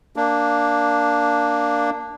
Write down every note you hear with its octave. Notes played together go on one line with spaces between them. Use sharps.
A#3 D4